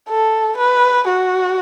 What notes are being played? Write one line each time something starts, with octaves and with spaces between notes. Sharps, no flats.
A4
B4
F#4